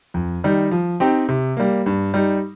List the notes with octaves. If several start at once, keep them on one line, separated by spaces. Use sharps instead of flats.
F2
D#3 G3 D#4
F3
C4 D#4 G4
C3
G3 A#3
G2
G3 D#4